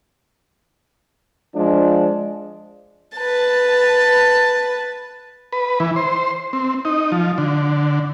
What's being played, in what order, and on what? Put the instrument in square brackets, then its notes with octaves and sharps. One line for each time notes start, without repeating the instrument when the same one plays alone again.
[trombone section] F3 G#3 D4
[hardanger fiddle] B4 A5
[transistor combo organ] B4
E3
C5
C4
D#4
F3
D3